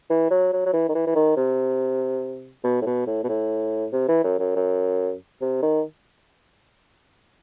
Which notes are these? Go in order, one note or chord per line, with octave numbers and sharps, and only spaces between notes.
E3
F#3
F#3
F#3
E3
D#3
E3
E3
D#3
C3
B2
A2
B2
A2
B2
A2
C3
E3
F#2
F#2
F#2
C3
D#3